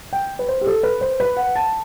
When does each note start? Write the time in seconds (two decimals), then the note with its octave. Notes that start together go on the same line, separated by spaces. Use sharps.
0.13 G5
0.39 B4
0.48 C5
0.61 G4
0.67 A4
0.83 B4
1.01 C5
1.20 B4
1.37 F#5
1.56 A5